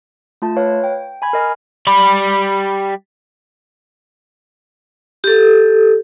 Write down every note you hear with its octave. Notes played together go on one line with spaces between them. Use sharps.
A3 F4 A5
B4 C#5 F5
G5
G#5 B5 G#6
A#4 D#5 G#5 F6
G3 B5
G4 A4